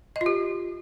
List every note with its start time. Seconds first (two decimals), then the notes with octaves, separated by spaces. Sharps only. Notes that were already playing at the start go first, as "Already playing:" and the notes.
0.16 D#5
0.21 F4
0.26 G4